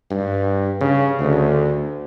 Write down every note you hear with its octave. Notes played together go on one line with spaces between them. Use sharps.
G2
C#3
D2